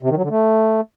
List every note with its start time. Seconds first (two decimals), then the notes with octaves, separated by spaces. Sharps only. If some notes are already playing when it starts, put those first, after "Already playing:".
0.03 C3
0.10 D#3
0.17 F#3
0.23 D3
0.30 A3